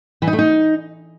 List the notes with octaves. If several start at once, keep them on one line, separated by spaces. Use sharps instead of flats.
E3
D#4
A3
D#4